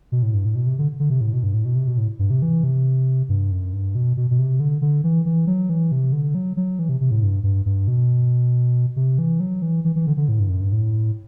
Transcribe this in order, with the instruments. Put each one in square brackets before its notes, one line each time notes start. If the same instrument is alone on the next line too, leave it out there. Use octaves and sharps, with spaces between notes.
[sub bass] B2
A2
G2
A2
B2
C3
D3
D3
C3
A2
B2
G2
A2
B2
C3
B2
A2
G2
C3
E3
C3
G2
F#2
G2
B2
B2
B2
C3
D3
D3
E3
E3
F#3
E3
C3
D3
F#3
F#3
E3
C3
C3
A2
G2
G2
G2
B2
C3
E3
F#3
E3
E3
E3
D3
D3
A2
G2
F#2
G2
A2